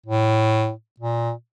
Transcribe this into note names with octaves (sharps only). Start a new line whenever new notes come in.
A2
A#2